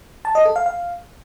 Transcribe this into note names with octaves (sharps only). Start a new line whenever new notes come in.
A5
D#5
A4
F5
F5